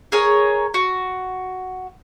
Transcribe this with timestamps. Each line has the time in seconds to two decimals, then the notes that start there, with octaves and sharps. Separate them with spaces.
0.12 G#4 A#4 C#5
0.74 F#4